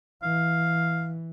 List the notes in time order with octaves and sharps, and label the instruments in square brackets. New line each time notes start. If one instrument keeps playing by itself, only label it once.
[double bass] E3 [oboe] F5